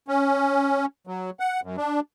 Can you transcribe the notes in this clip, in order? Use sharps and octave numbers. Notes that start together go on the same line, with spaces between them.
C#4
F#3
F#5
F#2
D4